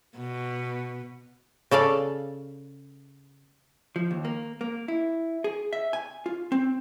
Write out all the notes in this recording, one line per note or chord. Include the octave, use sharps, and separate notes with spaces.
B2
C#3 A4 D5 F5
F3
D#2
A#3
A#3
E4
G#4
E5
G#5
F4
C4